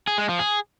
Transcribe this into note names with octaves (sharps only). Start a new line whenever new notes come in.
G#4
G#3
F3
G#4